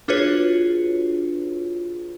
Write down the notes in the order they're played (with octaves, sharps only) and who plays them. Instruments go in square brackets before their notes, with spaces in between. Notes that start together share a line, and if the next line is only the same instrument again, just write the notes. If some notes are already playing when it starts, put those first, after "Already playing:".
[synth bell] D4 F4 F#4 G#4 B4 C#5